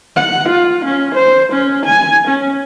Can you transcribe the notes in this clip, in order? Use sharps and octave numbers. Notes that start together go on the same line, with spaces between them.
F#5
F4
C#4
C5
C#4
G#5
C#4